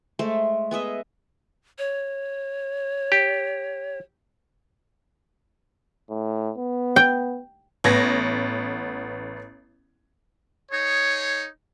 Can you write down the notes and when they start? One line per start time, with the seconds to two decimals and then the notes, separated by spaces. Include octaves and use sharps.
0.19 G#3 A3 C5
0.71 B3 G#4 D#5 E5
1.79 C#5
3.12 G4
6.10 A2
6.58 B3
6.96 G5
7.84 A1 B3 G#6 A#6
10.72 D#4 G#4 C#5